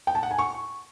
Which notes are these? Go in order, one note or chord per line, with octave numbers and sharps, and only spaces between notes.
G5
A5
F#5
G#5
C#6